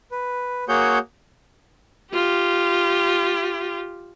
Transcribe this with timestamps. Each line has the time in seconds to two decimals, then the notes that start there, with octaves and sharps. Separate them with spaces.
0.12 B4
0.69 A#3 F#4 G#4 C#5 F#5 G6
2.12 F4 G4